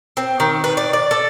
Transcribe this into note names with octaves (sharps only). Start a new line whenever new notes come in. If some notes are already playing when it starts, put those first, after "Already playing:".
C4
D#3
B4
D5
D5
A4